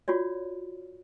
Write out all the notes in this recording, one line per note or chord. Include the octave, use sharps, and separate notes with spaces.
F4 F#4 C#5 D5